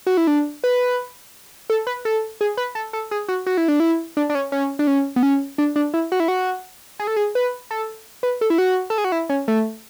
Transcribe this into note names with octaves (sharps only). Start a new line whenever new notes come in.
F#4
E4
D4
B4
A4
B4
A4
G#4
B4
A4
A4
G#4
F#4
F#4
E4
D4
E4
D4
D4
C#4
C#4
D4
C#4
B3
C#4
D4
D4
E4
F#4
E4
F#4
G#4
A4
G#4
B4
A4
B4
A4
E4
F#4
A4
G#4
F#4
E4
C#4
A3